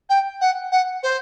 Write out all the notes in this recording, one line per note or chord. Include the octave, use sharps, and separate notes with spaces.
G5
F#5
F#5
C5